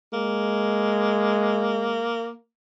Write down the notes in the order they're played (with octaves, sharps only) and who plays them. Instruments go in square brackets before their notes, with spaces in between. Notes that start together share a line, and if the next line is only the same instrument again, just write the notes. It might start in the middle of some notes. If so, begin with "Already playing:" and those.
[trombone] G#3 [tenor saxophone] A#3